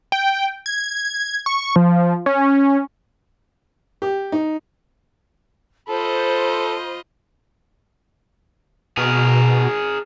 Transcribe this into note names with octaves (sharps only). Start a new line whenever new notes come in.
G5
G#6
C#6
F3
C#4
G4
D#4
F4 A4 C5 D#5 B5
B2 G#4 A#4